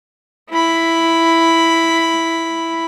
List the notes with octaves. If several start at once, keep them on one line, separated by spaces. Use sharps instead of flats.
E4 B5